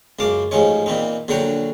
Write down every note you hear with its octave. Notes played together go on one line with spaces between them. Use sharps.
C#2 F#2 F5 A5 D6
A1 G#2 F3 C#4 D#4 C#5
A#2 E3 C4 D#4
A#1 D3 F#3 F#5 G5 A#5